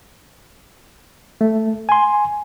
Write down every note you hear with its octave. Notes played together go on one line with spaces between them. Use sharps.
A3
G#5 C6